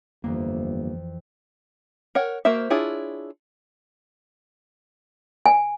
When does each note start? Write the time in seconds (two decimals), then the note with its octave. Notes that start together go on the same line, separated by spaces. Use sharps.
0.24 G1 F2 E3 A#3
2.15 A#4 C#5 F#5
2.45 A#3 F#4 A#4 C5 E5
2.70 D4 E4 F4 G#4 C#5
5.46 G#5